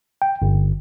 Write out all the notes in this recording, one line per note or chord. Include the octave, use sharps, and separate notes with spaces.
G5
G1